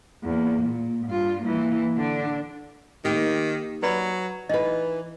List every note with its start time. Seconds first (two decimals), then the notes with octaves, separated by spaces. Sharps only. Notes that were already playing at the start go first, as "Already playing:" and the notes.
0.24 E2 A#3
0.63 A#2
1.06 G2 F4
1.43 E3 A#3
1.97 D3 D4
3.05 D#3 A#3 D#4 G4
3.83 F#3 B4 D5 B5
4.49 E3 D#4 B4 D#5